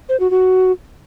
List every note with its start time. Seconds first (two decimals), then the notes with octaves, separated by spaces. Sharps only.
0.09 C5
0.20 F#4
0.31 F#4